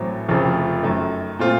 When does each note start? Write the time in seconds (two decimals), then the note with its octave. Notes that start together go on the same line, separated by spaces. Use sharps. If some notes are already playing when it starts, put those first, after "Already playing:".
Already playing: A1 A2 F#3 C4
0.29 F1 F2 C#3 F3
0.83 F#2 D#3 A3
1.39 A#2 A3 C4 F4